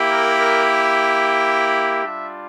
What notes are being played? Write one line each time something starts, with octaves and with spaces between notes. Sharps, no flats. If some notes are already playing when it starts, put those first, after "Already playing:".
Already playing: A#3 E4 G4
A#4
A#4
G3 D4 F4 E5